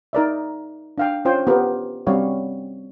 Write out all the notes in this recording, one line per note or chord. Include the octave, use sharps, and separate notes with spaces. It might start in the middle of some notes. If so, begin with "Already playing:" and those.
D#4 A#4 D5 E5
D4 F5 G5
C#4 F4 C5 G5
B3 F4 G4 A#4
G3 C4 C#4 F#4 C#5 F5